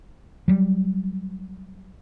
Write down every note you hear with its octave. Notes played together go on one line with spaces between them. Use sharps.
F#3 G3